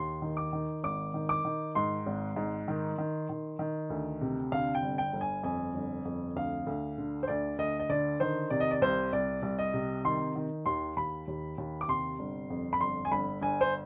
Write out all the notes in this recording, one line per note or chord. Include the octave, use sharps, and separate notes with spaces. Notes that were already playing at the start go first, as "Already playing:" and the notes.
Already playing: D#2 C6
D#3
D6
D#3
G#1 D6
D#3
D6
D#3
G#2 C6
G#1
G#2
D#3
D#3
D#3
D#3
D2
C3
D3 F5
G5
G1
G5
G1
G#5
F2 G#5
G1
F2
D2 F5
D2
D3
C5
D2 D5
D2 D#5
D#5
D3 D5
D#3 C5
C3 D5
D#5
D5
C2 C5
C2 D5
C2
D#5
C3
D#3 C6
D#3
D#2 C6
D#2 B5
D#2
D#2
D6
C3 C6
G1
F2
B5
G1 C6
G#5
G1 B5
G1 G#5
C5